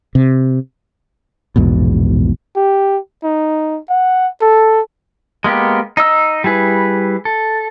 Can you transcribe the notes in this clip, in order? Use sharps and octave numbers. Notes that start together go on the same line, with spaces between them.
C3
A#1 E2 G#2 B2
G4
D#4
F#5
A4
G#3 A#3 B3 G4
D#4 D#5 E6
G3 E4 G#4 B4
A4